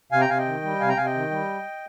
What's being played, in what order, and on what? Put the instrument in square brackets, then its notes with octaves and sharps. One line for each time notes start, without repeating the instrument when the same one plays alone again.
[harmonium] C3 F5 G#5
G5 A#5
C3 F5 G#5
D#5 G5
D#3
G3
C3 F5 G#5
G5 A#5
C3 F5 G#5
D#5 G5
D#3
G3